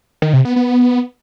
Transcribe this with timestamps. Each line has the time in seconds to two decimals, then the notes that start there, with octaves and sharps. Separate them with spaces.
0.22 D#3
0.33 C3
0.45 B3
0.56 B3